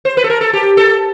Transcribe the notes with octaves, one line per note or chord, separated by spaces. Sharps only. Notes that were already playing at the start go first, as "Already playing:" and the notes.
C5
B4
A4
A#4
A4
G4
A4